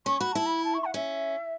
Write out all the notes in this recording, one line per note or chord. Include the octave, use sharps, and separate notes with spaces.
C#4 C#6
F#4 B5
E4 A5
B5
A5
C#6
F#5
C#4 E5